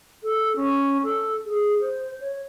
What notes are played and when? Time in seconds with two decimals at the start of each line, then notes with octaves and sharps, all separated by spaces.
0.23 A4
0.56 C#4
1.03 A4
1.46 G#4
1.81 C5
2.20 C#5